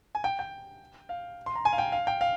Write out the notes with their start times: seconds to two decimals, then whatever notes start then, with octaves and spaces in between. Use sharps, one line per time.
0.15 G#5
0.24 G5
0.39 G5
1.09 F5
1.46 C6
1.55 A#5
1.65 G#5
1.73 F5
1.78 G5
1.92 F5
2.07 G5
2.21 F5